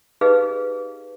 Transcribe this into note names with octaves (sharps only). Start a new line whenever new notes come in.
D#4 G4 G#4 B4 D#5 F5